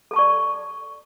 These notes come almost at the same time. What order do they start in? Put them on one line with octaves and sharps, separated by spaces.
A4 A5 C#6 D5